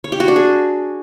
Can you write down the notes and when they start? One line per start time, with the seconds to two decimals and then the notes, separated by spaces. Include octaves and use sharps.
0.04 C#5
0.12 G4
0.20 F#4
0.28 D4
0.36 G#4